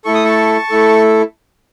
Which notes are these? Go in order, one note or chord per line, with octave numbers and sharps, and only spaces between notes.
A3 E4 A4 C#6
D#6
A5 C#6
A3 E4 A4